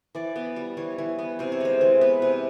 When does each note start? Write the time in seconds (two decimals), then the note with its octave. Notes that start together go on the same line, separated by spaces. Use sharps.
0.15 E3 D5
0.36 B3
0.56 G3
0.77 E3 C#5
0.98 E3
1.19 B3
1.39 C3 C5
1.52 C#5
1.60 G#3 C5
1.81 E3
2.01 B3 B4
2.22 C3